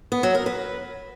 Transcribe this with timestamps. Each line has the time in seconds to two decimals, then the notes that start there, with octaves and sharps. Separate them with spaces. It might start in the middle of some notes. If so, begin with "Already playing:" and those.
0.12 B3
0.23 F#3
0.35 A#4
0.46 B4